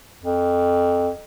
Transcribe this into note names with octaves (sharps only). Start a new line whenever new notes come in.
F2